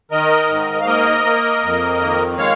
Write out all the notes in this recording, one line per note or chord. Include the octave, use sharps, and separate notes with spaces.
D#3 A#4 D#5
G#2
F5
A#3 A#4 D#5
A#3
F2
D#3
G#3 C#5 F5